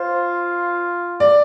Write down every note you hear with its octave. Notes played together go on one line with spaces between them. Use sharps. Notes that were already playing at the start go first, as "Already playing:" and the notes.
Already playing: F4 C5
D5